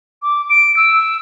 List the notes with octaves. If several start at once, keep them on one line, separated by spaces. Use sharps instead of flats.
D6
D7
E6